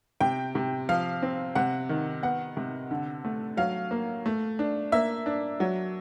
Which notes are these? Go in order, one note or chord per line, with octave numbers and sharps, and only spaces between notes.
C3 G5
C3
F3 F5
C4
C3 F#5
D#3
B3 F#5
C3
D3
A3
F#3 F5
A#3
A3
D4
A#3 E5
D4
F#3